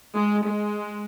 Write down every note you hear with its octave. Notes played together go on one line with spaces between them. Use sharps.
G#3
G#3